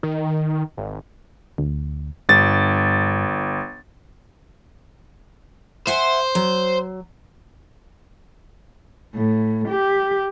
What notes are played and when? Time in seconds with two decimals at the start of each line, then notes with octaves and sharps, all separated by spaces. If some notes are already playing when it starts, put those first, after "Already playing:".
0.03 D#3
0.77 G#1
1.58 D2
2.29 G1 G2 A6
5.87 C5 E5 F#5 G#5
6.35 F#3
9.15 A2
9.69 G4